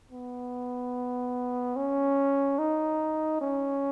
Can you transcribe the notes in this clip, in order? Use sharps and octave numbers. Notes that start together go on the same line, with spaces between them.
B3
C#4
D#4
C#4